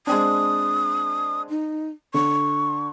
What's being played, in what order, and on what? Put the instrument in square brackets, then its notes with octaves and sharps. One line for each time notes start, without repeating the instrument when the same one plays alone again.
[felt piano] G#3 C4 D4 [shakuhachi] D#6
[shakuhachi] D#4
[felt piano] D3 [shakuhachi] C#6